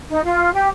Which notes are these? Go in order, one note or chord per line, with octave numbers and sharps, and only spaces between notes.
D#4
F4
G4